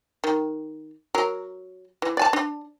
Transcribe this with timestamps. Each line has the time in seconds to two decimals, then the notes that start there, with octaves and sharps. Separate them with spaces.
0.24 D#3
1.15 F#3 A#4
2.02 E3
2.17 D5 G#5 A5
2.33 D4